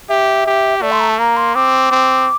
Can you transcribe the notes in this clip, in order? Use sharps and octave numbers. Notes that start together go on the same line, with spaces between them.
G4 E5
G4
A3 D5
C6
A#5
A5
A#3 A#5
C6
C4 D6
C4